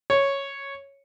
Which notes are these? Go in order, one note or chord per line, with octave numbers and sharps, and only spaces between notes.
C#5